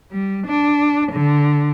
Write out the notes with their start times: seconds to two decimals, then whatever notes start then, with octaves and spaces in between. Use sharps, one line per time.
0.11 G3
0.47 D4
1.12 D3